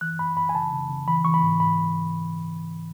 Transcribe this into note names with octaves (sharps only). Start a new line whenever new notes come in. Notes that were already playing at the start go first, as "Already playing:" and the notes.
E3 F#6
F#2 B5
F#2 B5
G#5
C#3 A5
C#3
C#3
E3 B5
E3 C#6
B5
G#2
G#2 B5